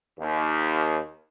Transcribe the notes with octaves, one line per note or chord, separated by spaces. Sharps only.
D#2